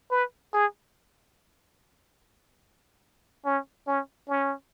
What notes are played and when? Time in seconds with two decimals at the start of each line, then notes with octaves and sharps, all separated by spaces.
0.11 B4
0.53 G#4
3.45 C#4
3.87 C#4
4.28 C#4